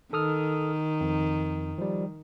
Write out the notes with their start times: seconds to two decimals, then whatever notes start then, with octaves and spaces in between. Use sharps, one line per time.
0.13 D#3 A4 D#6 F6
1.01 F2
1.78 F3 G3